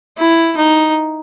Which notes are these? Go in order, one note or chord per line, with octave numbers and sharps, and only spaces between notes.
E4
D#4